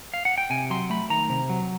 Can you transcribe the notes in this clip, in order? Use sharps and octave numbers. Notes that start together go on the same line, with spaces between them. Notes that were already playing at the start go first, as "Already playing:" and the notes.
F5
F#5
G5
C3 G#5
F#3 C6
A3 B5
D#3 A#5
C3
F#3